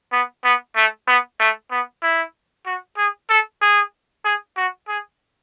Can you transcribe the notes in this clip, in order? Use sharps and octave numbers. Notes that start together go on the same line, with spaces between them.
B3
B3
A3
B3
A3
B3
E4
F#4
G#4
A4
G#4
G#4
F#4
G#4